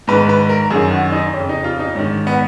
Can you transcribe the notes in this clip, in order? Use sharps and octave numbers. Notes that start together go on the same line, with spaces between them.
G#2 D#3 B4
B4
A#4
F#2 D#3 G#4
F#4
D#4
F2 C#3 C#4
D#4
F4
D#4
G#2 D#3 C#4
B3